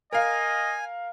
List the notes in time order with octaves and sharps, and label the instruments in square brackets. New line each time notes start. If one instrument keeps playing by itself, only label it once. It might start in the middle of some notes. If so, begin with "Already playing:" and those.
[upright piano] A#4 F5 [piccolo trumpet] D#5 [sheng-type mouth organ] G#5